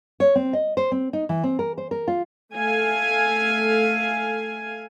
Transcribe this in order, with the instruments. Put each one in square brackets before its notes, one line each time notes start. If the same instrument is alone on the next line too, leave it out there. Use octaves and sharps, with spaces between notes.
[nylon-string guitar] C#5
C4
D#5
C5
C4
D#4
E3
C4
A#4
C5
A#4
F4
[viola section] A3 F5 G#5